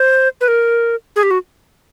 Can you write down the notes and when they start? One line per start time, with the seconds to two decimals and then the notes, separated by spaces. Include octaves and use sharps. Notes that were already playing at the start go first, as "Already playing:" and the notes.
Already playing: C5
0.41 B4
0.48 A#4
1.16 G#4
1.23 G4
1.31 F#4